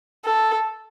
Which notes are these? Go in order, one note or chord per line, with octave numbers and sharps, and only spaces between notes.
A4